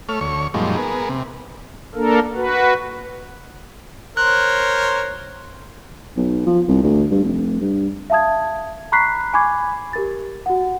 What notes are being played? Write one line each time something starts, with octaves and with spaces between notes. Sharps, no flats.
A3 C#5 F6
D2 C#5 C#6
F#2 A#2 F3 G3 G#3 D#4
B3 G#4 A#4
C3
A#3 D4 A4 A#4
F#4 B4
A#4 C5 C#5 F#6
B1
F3
C2
D2
G2
F1
G2
E5 F5 A5 D#6 G#6
A#5 B5 C#6 F#6 B6 C7
G#5 B5 C#6 D6 G#6
G4 A#4 A6
F#4 F#5